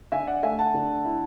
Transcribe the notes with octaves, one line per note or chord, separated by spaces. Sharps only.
D3 E5 G#5
D5 F#5
A3 E5 G#5
F#5 A5
D3
E4